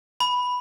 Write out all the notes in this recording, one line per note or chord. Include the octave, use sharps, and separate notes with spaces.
B5